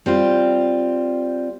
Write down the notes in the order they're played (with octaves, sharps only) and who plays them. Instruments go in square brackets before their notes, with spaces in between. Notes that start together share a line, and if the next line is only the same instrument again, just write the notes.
[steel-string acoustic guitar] G3 C4 F4